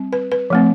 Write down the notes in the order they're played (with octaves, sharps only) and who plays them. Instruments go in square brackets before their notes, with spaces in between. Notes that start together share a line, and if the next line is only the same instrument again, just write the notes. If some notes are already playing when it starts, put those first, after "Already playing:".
Already playing: [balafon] G3 C4
B4
B4
F3 A3 C4